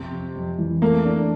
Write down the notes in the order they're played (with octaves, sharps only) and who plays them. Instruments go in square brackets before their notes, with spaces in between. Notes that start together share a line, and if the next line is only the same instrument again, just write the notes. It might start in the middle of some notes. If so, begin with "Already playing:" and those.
Already playing: [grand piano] F2 [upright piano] C3
[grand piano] F2
F2
E3
[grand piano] A3 [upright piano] A#3
[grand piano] D4